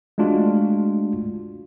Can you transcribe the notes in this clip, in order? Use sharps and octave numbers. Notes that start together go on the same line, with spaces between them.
G#3 A3 D4 F4 F#4